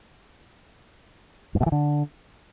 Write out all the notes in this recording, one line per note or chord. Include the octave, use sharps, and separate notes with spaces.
G2
B2
E3
D3